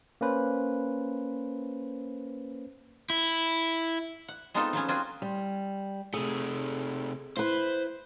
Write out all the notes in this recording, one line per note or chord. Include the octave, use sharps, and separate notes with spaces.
A#3 C#4 B4 C5
E4
F#5
G#3 B3 C4 D#4 F4 A4
F3 F#3 B3 C#4
F#3 C4 F4 F#4 G#4
G3
C3 A3 G#4
E4 B4 C5